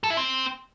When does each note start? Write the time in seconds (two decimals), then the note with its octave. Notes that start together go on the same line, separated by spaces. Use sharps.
0.04 A4
0.10 E4
0.17 C4